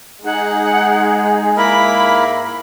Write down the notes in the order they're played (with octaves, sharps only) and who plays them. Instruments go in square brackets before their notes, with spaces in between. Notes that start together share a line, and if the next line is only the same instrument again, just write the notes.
[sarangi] G#3 [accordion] D#4 G#4 [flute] F#5
[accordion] G#2 [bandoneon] A#3 E4 A#4 [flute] B5